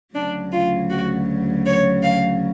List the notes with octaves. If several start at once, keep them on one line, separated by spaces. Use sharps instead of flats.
D2 C#3 F#3 D4
F4
F#4
C#5
F5